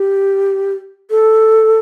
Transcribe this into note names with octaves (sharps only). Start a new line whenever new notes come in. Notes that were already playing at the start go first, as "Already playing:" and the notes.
Already playing: G4
A4